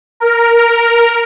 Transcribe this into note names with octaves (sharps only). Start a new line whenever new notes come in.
A#4